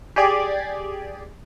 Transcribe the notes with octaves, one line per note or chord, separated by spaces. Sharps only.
G4 G#4 D5 D6 G#6